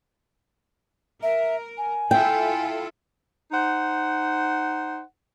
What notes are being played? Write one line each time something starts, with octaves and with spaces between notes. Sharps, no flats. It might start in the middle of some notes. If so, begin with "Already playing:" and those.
A#4 E5
G#5
E4 F4 A4 G5
D#4 C5 F#5